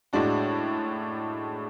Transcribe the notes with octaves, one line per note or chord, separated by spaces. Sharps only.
A2 G#3 D4 F#4